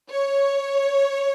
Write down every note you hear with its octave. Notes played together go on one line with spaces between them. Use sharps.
C#5